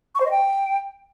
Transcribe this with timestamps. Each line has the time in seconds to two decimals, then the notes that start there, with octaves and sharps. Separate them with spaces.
0.15 C#6
0.20 C5
0.25 D#5
0.31 G5